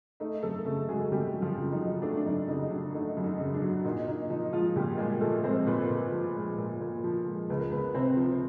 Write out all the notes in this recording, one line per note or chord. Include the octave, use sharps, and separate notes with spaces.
A3 D#4
F#2 A3 A4
C#3 A3 A4
F#3 G#3 G#4
G3 A3 G4
F#2
F3 F4
C#3
D#4
F#3
A3 D4
D4
F#2 D#4
C#3 D#4
F#3 D4
A3 D#4
F#2
D#4
C#3
D4
F#3
A#2 D#4
A#2 D#4
F3 D#4
F3 G#3 F4
A#2 G3 G4
A#2 G#3 G#4
F3 A3 A4
G#3 C4 C5
A#2 B3 B4
A#2
F3
G#3
A#2
A#2
F3
G#3
C#2 B4
A#4
C#2 B3 B4
C3 C4 C5
F3